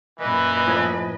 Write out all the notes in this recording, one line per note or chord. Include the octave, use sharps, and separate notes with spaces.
F#2 A#2 E3 B4 D#5
A2 F3 G#5